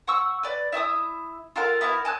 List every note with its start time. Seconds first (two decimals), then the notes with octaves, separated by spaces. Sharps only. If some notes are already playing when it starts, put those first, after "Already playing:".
0.07 F#5 C#6 E6
0.43 B4 D5
0.72 E4 E5 D6 D#6
1.56 F4 A4 A#4 F#5
1.81 B3 E4 F#4 A#4
2.05 G#5 A5 D#6 F#6